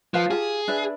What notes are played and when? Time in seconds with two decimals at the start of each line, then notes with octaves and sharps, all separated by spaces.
0.14 F3 B4 F5 A5
0.31 F4 G4 G#4 A5
0.68 D4 B4 E5